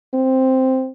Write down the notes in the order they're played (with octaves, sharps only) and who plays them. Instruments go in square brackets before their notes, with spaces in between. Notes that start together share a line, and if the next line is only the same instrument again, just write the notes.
[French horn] C4